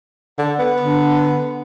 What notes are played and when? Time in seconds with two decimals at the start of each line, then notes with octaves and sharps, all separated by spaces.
0.39 D3
0.59 B3
0.80 D3